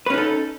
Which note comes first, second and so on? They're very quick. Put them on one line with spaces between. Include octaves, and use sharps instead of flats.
B4 C#4 D#4 A4